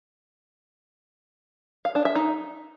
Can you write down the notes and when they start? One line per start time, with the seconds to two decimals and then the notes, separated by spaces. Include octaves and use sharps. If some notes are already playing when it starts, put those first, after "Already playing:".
1.85 F5
1.95 D4
2.05 E5
2.15 D#4